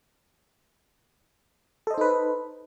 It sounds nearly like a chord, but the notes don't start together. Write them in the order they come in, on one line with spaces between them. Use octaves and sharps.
A4 D#5 C5 D#4 B4